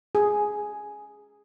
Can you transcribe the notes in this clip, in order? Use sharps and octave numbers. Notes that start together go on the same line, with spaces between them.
G#4